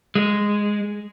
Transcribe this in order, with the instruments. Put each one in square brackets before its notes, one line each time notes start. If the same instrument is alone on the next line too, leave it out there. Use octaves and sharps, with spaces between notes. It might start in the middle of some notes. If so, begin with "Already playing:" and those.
[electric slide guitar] G#3